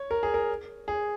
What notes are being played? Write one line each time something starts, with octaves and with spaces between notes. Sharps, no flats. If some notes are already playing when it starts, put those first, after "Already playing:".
Already playing: C#5
A#4
G#4
A#4
G#4